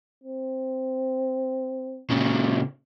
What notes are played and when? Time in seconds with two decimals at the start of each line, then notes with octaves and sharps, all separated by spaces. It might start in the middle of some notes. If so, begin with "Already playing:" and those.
0.24 C4
2.10 A#2 C#3